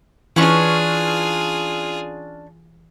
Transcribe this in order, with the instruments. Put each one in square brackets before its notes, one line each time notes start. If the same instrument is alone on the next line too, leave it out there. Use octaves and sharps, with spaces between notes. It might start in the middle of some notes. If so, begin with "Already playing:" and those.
[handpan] E3 [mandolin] C#4 D4 C#6 [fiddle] F4 G#4